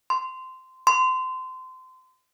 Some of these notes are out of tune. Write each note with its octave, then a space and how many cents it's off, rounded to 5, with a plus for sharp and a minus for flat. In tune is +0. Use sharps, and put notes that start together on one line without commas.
C6 -20
C6 -25